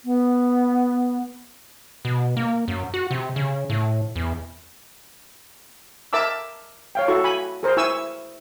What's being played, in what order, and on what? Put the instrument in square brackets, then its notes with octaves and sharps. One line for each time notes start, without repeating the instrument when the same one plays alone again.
[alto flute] B3
[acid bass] B2
A#3
F#2
F#4
C3
C#3
A2
E2
[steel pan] A#4 E5 A5 D6 E6
C#5 F5 G5
E4 F#4 A4 C#6
G#5 B5
G#4 A#4 C5
E4 G#5 C#6 E6